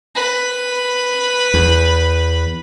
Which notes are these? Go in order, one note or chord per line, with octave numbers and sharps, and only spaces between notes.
B4
E2